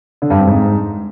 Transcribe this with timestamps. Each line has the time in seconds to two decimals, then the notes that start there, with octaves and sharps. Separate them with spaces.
0.22 D3
0.30 G2
0.39 C4
0.47 G#2